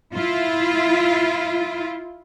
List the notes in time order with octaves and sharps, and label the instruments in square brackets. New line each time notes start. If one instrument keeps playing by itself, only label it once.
[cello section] E4 F4